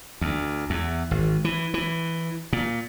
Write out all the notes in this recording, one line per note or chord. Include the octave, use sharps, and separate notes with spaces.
D2
E2
G#1
E3
E3
A#2